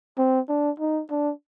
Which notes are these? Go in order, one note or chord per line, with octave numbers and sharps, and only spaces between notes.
C4
D4
D#4
D4